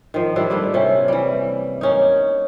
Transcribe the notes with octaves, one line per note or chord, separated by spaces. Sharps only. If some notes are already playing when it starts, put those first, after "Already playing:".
D#3 F3
F3 G3 D4 E4
G3 A3 A#3
C3 C#4
E3 G3
A#3 C#4 D#4